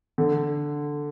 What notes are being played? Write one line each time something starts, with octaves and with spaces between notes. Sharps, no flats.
D3